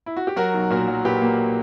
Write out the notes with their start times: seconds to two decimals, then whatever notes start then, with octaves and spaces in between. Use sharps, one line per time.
0.06 E4
0.17 F#4
0.27 G4
0.36 F#3 F#4 A#4
0.54 B1
0.70 A#2 F#4 A#4
0.88 F#3
1.04 A#2 G4 B4
1.21 A#3